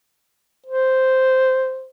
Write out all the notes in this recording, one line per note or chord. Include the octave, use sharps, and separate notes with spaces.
C5